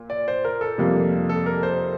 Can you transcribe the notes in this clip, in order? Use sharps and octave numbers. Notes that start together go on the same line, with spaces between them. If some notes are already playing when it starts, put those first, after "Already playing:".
Already playing: A#2
D5
C5
A#4
A4
F2 C3 G3 A#3
A4
A#4
C5